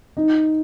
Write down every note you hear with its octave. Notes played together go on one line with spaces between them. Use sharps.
D#4